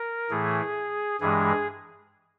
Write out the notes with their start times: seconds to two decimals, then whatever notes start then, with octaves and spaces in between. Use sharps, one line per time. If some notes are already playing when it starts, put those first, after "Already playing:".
Already playing: A#4
0.31 A2 E3 A3 G#4
1.20 G2 E3 G#3 G#4